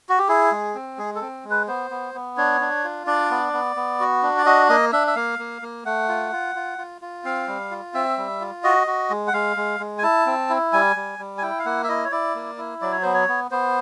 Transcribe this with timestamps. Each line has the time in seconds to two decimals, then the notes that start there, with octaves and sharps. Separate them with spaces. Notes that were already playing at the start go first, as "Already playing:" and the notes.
0.09 F#4
0.19 G4
0.28 E4 G#4
0.52 G#3
0.75 C4
0.98 G#3 G#4
1.15 A4
1.21 C4
1.44 G#3
1.50 B4
1.67 B3 C5
1.91 B3
2.14 B3
2.37 D4 C#5
2.61 D4
2.84 F4
3.07 D4 D5
3.30 B3
3.53 B3
3.76 B3
4.00 F#4
4.23 D4
4.38 D5
4.46 F#4 D#5
4.69 A#3 D#5
4.93 D4 E5
5.07 E5
5.15 A#3 F5
5.39 A#3
5.62 A#3
5.85 A3 F#5
6.09 F4
6.32 F4
6.55 F4
6.78 F4
7.02 F4
7.25 C4 F5
7.48 G3
7.71 F4
7.94 C4 E5
8.18 G3
8.41 F4
8.64 F#4 D#5
8.87 F#4
9.10 G#3
9.27 F#5
9.33 G#3 F5
9.57 G#3
9.80 G#3
9.98 G#5
10.03 E4 A5
10.26 C4
10.49 E4
10.73 G3 G#5
10.96 G3
11.19 G3
11.38 G#5
11.42 E4 G5
11.59 F5
11.65 A#3 F#5
11.84 E5
11.89 E4 D#5
12.05 C#5
12.12 E4 D5
12.35 A#3
12.58 E4
12.81 F#3 D5
12.92 C#5
13.02 B3 C5
13.14 C#5
13.28 B3
13.51 B3 C5